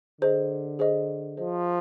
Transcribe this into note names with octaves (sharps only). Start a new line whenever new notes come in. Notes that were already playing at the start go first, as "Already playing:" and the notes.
D3 G#4 C5 D#5
G#4 C5 D#5
F3 G#4 C5 D#5